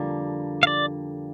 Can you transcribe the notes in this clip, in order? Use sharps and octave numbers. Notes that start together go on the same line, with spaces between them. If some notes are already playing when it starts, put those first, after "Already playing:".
Already playing: F2 D3 G3 A#3
F5
D5